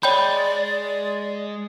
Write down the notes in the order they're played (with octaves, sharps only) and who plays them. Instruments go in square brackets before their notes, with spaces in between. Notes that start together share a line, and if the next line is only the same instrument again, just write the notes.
[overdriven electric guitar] G#3 [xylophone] C#5 G5 G6 [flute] D5 [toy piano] B5